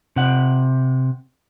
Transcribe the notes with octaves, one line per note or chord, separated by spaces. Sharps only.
C3 F#5